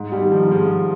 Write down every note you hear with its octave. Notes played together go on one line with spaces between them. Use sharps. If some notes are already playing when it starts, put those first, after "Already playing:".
Already playing: G#2
G3
D#3
F3
G#2 F3 G#3